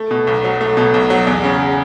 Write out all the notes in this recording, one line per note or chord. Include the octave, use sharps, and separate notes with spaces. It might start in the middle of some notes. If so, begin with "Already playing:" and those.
Already playing: A3
B2
B1
F#3
A3
B2
B1
F#3
E2
C#3